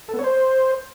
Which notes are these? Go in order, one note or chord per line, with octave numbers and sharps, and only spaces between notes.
A4
B3
C#5
C5